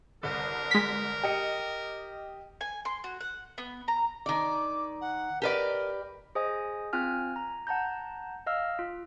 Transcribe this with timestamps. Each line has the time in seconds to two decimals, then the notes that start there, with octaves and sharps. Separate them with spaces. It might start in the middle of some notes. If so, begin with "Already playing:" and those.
0.23 G1 C2 A#4
0.71 G#3 B6
1.23 G4 D#5 C#7
2.61 G#5
2.85 C6
3.04 F#4
3.20 F#5
3.58 B3
3.88 A#5
4.26 D#3 D5 D6
5.01 F#5
5.42 G4 A#4 B4 D5
6.35 G#4 C5 D#5 G#5 D#6
6.93 C4 F4 G#5 F6
7.36 A#5
7.67 F#5 A5 A#5 G6
8.47 D#5 F5 E6 F6
8.79 F4